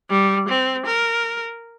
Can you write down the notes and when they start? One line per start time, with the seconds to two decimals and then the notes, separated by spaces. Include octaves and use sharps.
0.10 G3
0.49 C4
0.87 A#4